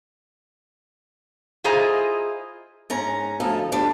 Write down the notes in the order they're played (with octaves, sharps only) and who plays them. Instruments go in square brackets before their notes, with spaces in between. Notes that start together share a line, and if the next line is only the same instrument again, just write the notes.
[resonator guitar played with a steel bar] E4 F4 G#4 C5 D#5 A#5
[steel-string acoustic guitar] G#2 C#4 A#5
D2 A2 F3 A4 D#5 F5
F3 G3 A3 D4 B4